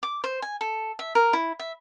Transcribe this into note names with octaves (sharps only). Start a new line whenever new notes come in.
D6
C5
G#5
A4
E5
A#4
E4
E5